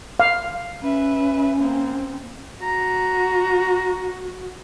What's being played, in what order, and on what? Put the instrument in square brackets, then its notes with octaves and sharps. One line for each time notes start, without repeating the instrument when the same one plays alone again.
[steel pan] F5
[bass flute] C#4 [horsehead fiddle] B4 E5
[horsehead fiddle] A#3 C4
[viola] F#4 [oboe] A#5